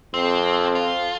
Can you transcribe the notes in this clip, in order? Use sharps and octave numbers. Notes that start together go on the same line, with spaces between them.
F2 C4
F4